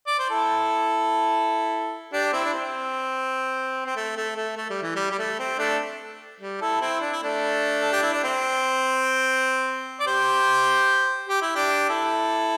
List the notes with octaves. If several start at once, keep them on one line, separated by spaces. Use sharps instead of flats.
D5
C5
E4 A4
D4 G4
C4 E4
D4
C4
C4
A3
A3
A3
A3
G3
E3
G3
G3
A3
C4
A3 D4
G3
E4 A4
C4 E4
D4
E4
A3 D4
A4
G4
E4
D4
C4
D5
G4 C5
G4
E4
D4 G4
E4 A4